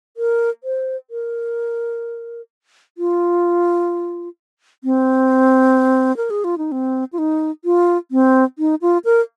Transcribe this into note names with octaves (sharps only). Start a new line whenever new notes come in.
A#4
C5
A#4
F4
C4
A#4
G#4
F4
D#4
C4
F4
D#4
F4
C4
D#4
F4
A#4